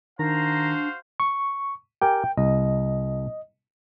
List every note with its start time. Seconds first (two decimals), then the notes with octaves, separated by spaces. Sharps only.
0.19 D#3 D4 F#4 C5 F5 A#5
1.20 C#6
2.02 G4 A#4 G5 G#5
2.38 C2 D#5